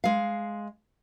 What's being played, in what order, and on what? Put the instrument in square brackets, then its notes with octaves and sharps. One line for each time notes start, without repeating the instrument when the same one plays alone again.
[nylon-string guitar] G#3 F5